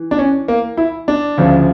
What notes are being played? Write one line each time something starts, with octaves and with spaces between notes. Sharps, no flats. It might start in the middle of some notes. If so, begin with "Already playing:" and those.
Already playing: E3
D4
C#4
A#3
E4
D4
D2 C#3 F3